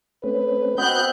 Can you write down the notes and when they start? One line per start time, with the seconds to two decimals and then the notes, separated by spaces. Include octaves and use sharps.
0.24 A3 C4 C#4 B4
0.78 B3 C4 F#4 B4 D#5 F#6 G6